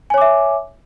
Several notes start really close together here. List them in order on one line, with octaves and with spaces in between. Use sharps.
G#5 C#5 D6 E5